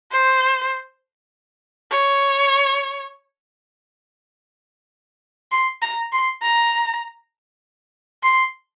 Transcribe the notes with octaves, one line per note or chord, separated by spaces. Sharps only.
C5
C#5
C6
A#5
C6
A#5
C6